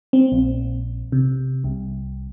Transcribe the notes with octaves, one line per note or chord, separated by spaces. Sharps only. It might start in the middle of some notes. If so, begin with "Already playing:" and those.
C4
A#1
C3
C2